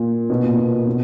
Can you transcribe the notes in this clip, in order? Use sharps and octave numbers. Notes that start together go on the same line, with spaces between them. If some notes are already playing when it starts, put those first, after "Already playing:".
Already playing: A#2
B2
A#2
B2
B2